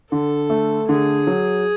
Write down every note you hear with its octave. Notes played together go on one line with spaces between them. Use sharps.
D3 A4
A3
D3 G#4
F#3